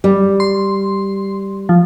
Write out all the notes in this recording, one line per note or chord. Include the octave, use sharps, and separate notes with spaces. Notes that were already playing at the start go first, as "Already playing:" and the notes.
G3
C6
F3